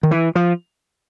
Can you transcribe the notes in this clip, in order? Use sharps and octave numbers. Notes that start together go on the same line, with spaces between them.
D#3
E3
F3